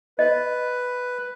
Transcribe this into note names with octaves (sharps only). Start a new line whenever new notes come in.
B4 D#5